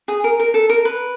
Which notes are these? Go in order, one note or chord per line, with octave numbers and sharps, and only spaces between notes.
G#4
A#4
A#4
A4
A#4
B4